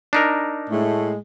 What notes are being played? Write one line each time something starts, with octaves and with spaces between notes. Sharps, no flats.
D4 D#4 A#4
A2 G#3 A3